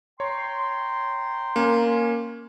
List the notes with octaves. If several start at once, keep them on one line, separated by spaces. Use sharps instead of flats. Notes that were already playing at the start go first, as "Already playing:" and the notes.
C#5 G5 A#5 C6
A#3 C#4